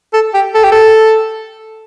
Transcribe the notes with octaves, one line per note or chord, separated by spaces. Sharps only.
A4
G4
A4
G4
A4